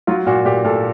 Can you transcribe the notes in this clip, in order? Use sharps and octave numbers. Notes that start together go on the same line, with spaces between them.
F#3 F4
A#2 F#4
A#2 G4
A#2 A4